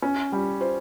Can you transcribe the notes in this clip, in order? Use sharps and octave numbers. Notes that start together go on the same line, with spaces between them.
C#4
G3
C5